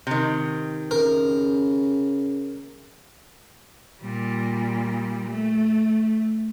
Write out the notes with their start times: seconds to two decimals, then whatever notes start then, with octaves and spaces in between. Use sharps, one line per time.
0.07 C3 D#3
0.91 C#3 A#4
4.01 A#2 G3
5.30 A3